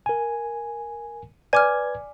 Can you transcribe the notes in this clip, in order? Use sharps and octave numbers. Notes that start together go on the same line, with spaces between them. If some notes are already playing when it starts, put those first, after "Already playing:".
A#4 G#5
B4 D5 G#5 D6 F6 G#6